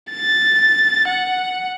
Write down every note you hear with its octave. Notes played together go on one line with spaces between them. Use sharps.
A6
F#5